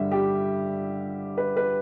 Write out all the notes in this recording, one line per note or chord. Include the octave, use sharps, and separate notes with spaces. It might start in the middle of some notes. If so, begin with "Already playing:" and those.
Already playing: G2 D3 G3 E5
G4
B4
B4